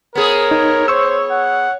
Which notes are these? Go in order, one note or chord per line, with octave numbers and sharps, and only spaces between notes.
B3 G#4 A#4 C#5
D#4
C5 C#6 E6
F#5